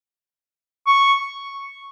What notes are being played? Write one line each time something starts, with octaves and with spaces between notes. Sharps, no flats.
C#6